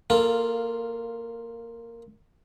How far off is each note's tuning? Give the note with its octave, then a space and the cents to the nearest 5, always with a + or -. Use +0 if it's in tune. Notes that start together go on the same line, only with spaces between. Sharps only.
A#3 -10 F4 +0 A4 +15